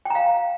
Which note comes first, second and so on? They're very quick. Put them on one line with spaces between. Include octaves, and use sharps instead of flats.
G5 A#5 F5